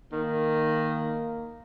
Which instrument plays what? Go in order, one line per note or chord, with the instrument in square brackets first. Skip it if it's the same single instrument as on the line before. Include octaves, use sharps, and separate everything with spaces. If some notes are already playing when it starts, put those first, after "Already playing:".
[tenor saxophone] D#3 [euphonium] A#3